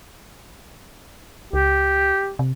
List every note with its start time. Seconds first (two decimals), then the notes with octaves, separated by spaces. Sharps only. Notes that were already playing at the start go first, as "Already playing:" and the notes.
1.53 C#2 G4
2.39 C3